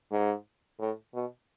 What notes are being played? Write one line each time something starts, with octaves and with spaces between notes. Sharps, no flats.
G#2
A2
B2